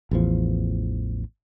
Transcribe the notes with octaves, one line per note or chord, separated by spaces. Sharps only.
A1 E2 F3